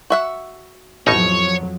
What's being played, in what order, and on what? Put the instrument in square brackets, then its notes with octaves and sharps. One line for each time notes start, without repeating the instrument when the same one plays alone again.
[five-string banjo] F#4 E5 F#5
[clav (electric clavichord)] A1 B2 D#4 [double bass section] F2 F3 F#3 [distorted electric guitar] C#5